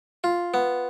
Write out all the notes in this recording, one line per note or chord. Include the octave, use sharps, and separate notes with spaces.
F4
B3